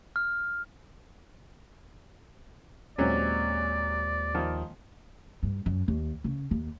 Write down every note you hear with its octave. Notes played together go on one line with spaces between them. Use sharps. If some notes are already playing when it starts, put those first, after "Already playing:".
F6
D#2 A#2 F#3 G#3 C4 C#4 G4 D5
D#3 F3
G2
F#2
D#2
C#3
D#2